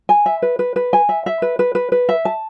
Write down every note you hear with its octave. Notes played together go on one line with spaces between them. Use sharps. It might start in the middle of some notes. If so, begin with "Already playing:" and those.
G#5
E5
B4
B4
B4
G#5
E5
E5
B4
B4
B4
B4
E5
A5